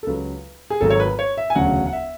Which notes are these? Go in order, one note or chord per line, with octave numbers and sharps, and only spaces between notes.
A4
C#2 C#3 F#3 B4
G#4
G#1 G#2 F#3 A4
C#5
B4
C#5
E5
G#5
E1 D2 C#3 F#3 F#5
F#5
E5